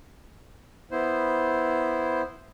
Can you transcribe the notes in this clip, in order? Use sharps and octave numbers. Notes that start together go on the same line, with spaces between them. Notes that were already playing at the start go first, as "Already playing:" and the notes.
B3 E4 C5